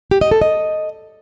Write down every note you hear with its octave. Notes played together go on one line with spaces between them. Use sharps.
G4
D#5
A4
D#5